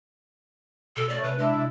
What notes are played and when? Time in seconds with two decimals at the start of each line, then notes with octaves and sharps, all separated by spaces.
0.97 B2 A4
1.09 A3 C#4 D5
1.23 C3 B4
1.39 G#3 D4 E4
1.55 C3